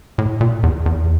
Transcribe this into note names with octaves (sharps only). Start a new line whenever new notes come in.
A2
A#2
E2
E2